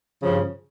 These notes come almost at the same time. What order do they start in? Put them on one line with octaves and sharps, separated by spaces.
C#3 F3 G2